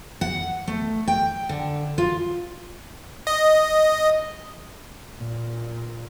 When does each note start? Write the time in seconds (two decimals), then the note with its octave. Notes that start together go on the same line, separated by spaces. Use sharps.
0.21 F#5
0.68 A3
1.08 G5
1.49 D3
1.98 F4
3.27 D#5
5.18 A#2